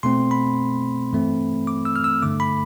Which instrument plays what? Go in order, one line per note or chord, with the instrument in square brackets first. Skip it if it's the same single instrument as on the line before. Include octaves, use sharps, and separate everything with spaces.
[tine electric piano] B2 A3 C4 C6
B5
G2 E3 A3 C4
D6
E6
F6
E6
G2 D3 A3 D6
B5